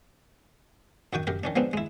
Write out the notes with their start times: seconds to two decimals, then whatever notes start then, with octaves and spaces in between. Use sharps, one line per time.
1.13 F#2 D#3 F#4 G5 D#6
1.27 F#2 G4 A#4
1.44 D#3 C#4 D4
1.56 F3 G#3 B3 C4 D4
1.73 G#3 E4